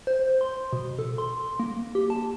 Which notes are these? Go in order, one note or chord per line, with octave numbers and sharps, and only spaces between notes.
C5
C6
B2
A4
C6
A#3
G4
A5